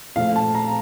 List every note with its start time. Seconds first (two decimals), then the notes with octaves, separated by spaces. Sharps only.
0.16 A#2 F3 A3 F5
0.36 A5
0.55 A#5